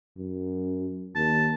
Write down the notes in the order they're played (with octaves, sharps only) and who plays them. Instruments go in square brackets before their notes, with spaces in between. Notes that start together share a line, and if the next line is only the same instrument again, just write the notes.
[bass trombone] F#2
[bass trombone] D#2 [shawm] A5